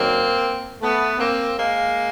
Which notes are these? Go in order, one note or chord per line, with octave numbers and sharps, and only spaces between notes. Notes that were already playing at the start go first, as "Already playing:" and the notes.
Already playing: F#2 D#3 F#3 A#3 C4
A3 B3
A#3 C4
G#3 A#3